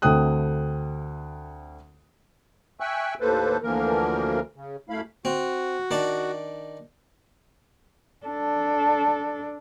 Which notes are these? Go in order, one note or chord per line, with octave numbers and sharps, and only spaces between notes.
D2 A3 C4 G5 D#6 F#6
E5 G5 G#5 C#6 E6 F#6
D#2 A2 A#3 A4 B4 C5
D2 D3 E3 F3 A#3 A#4
C#3
F#2 A3 E4 F5 B5
C4 F#4
D#3 D4 A5
D4 A4